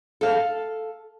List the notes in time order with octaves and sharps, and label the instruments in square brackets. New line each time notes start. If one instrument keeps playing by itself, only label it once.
[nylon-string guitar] A4 F5